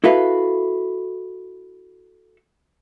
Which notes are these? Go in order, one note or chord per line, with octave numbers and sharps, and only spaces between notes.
E4 F#4 A4 B4 E5 F5